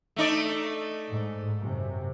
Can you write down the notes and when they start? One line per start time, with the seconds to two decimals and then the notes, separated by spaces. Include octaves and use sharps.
0.16 A3 D#4 D5
1.09 G#2
1.60 F#2 C3